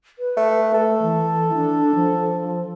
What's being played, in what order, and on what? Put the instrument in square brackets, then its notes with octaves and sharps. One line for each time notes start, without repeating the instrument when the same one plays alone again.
[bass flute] B4
[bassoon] A3
[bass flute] A3 [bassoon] A4
[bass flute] E3
D4
F3